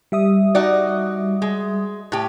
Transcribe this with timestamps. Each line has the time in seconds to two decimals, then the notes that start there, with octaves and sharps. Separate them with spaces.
0.12 G3 E5 D#6
0.55 D#4 F#4 D5
1.42 G#3
2.12 A2 G4